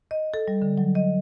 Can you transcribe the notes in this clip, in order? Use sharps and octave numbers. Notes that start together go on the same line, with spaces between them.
D#5
A4
G3
D3
F#3
D#5